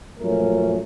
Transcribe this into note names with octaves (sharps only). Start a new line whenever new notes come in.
F#2 A#2 F3 A3 C#4 A#4